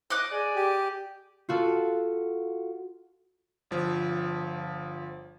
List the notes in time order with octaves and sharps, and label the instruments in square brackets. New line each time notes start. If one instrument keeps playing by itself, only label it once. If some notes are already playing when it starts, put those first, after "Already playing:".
[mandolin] D#5 D6 F#6
[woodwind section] G#4 D5 G#5
[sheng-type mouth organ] G4
[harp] F4 F#4 A4
[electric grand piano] G1 F3